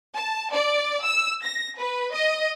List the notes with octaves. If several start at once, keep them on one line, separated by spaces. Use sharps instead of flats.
A5
D5
E6
A#6
B4
D#5